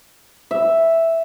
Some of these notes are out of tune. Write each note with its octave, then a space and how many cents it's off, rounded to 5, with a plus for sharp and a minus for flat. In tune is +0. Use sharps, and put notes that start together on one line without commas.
E5 +0